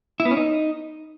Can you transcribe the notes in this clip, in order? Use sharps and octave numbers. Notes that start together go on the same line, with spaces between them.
E4
B3
C#4
D#4